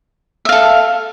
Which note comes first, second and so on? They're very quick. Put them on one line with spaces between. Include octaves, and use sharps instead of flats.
E5 F5 A4